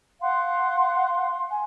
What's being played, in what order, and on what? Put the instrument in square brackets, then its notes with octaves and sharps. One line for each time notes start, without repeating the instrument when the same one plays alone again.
[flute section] F5 F#5 [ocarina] C6
[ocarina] G#5